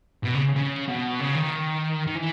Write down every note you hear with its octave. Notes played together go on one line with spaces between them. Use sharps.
B2
C#3
C#3
B2
C#3
D#3
D#3
E3